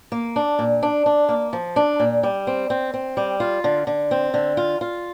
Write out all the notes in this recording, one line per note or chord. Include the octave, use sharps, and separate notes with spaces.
A#3
D4
A#2
D4
D4
A#3
F3
D4
A#2
G3
C4
C4
C4
G3
F4
D3
D3
C4
D3
F4
F4